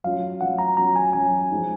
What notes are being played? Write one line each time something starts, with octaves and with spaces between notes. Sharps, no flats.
F#3 C#4 F4 F5
F#3 C#4 F4 F#5
A#5
F#3 C#4 F4 A#5
G#5
F#3 C#4 F4 G#5
F3 G#3 D#4